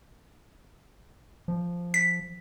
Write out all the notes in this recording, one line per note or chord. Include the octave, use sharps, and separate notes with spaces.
F3
B6